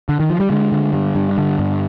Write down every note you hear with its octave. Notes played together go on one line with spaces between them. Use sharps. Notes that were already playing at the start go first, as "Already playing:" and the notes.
D3
D#3
F3
G3
D3 G#3
D3
G2
G2
D3
G2